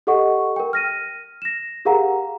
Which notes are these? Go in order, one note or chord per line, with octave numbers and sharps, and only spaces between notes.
G4 A4 D#5 F#5 C#6
A#4 G5
F6 A#6 D#7
A#6 E7
G4 G#4 A#4 F5 F#5 A#5